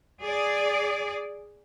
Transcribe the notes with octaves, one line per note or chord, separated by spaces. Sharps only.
G#4 D5